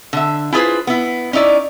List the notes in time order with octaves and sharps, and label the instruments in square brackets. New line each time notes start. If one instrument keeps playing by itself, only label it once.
[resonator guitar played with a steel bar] D3 E5
E4 F4 G#4 B4 C5
B3 E4
C#4 D#4 E4 D5